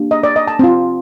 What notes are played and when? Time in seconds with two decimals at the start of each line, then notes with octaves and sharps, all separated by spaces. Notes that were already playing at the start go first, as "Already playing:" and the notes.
Already playing: A#3 D4 G4
0.11 D#5
0.23 D5
0.36 D#5
0.48 A5
0.59 C4 F4